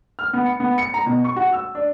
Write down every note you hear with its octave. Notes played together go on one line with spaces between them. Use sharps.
F6
B3
C#7
B3
C#7
A#5
B2
C#6
F#4
E6
D4